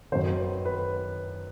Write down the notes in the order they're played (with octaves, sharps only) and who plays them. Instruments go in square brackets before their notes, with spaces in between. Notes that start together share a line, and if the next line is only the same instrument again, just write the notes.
[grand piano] F#2 D#3 C5
B4
B4